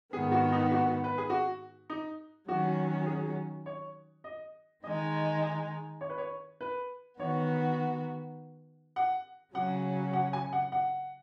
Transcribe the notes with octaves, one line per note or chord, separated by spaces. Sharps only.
G#2 D#3 B3 G#4
F#4
D#4
F#4
B4
G#4
F#4
D#4
D#3 F#3 C#4 F#4
G#4
C#5
D#5
D#3 G#3 D#4 D#5
D#5
C#5
B4
C#5
B4
D#3 B3 F#4 C#5
F#5
C#3 F#3 C#4 F#5
F#5
G#5
F#5
F#5